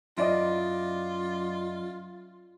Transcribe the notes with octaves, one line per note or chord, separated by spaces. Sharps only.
F#2 E4 F4 D5 D#5